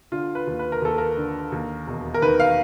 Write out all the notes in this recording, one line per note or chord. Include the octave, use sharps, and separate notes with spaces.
D3 F4
B4
D#2
B4
A#4
D#2 A4
A#4
D3
D#2
E1
A#4
D#3 B4
F5